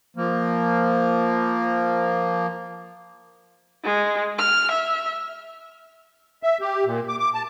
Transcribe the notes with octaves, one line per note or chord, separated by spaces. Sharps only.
F3 A#3
G#3
F6
E5
E5
G4
A#2
D6
D6
A5